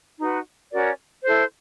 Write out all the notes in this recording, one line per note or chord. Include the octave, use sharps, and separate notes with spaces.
D#4 F#4 B4
C#4 F#4 A#4 D5
E4 A4 C5